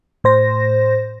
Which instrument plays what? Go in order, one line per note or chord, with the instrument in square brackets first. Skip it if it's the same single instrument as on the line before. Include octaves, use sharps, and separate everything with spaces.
[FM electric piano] A2 C5 A#6